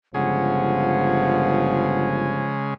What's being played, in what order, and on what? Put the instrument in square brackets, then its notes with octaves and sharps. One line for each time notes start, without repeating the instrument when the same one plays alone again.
[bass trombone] G1 [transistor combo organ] C#3 G#3 [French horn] F3 [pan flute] F#5